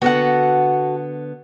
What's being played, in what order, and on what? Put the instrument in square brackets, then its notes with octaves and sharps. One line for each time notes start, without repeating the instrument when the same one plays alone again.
[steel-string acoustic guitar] D3 B3 [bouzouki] F#4 A4 F#5